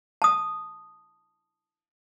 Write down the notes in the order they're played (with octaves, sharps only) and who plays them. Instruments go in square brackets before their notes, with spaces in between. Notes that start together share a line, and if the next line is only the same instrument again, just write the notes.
[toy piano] A5 D#6